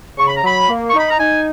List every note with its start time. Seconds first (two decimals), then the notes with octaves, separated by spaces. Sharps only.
0.18 C#3 C#6
0.27 B5
0.36 A#5
0.43 F#3 B5
0.69 A#3
0.89 C#6
0.94 D#4 B5
1.09 A#5
1.20 D#4 G#5